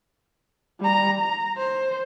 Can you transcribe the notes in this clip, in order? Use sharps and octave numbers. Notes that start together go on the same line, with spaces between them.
G3 A#5
A#5
C5